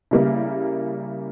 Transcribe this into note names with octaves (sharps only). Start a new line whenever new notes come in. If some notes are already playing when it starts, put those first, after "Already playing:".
C#3 G3 A#3 E4